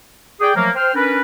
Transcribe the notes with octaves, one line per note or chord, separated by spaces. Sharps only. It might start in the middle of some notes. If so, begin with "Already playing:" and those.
G#4 D5 G5
F3 F#3 A3 A#3
C5 G5 F6
C#4 D4 A#4 B4